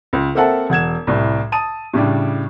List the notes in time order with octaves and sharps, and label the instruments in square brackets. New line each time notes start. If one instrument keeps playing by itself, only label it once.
[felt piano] C#2
A#3 C4 A4 E5 F#5 A5
E1 F#5 G#6 E7
C2 A2
A5 D#6 D#7
A2 C#3 G3 D4